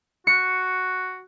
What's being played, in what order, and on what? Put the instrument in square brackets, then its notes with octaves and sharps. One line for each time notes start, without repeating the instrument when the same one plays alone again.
[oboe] F#4 [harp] C#7